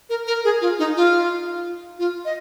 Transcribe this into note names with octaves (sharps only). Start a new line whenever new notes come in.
A#4
A#4
G#4
F4
D#4
F4
F4
D#5